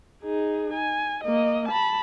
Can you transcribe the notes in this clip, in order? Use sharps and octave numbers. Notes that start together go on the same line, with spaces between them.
D#4 G#4
G#5
A#3 D#5
A5 B5